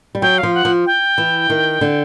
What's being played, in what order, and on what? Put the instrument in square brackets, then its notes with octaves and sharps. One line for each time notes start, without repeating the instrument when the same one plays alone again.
[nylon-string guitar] G3
[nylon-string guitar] F#3 [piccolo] G5
[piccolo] F5
[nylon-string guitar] F3
[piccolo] F#5
[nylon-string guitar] F3
[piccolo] G5
[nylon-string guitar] E3
D#3
D3